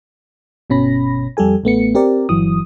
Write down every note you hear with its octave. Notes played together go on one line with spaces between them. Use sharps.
G1 B2 C#4 B5 A#6
F2 G3 G4 A4 G#5
A1 A3 B3 C#7
C4 G4 A#4 D5
G1 E3 F#3 D#6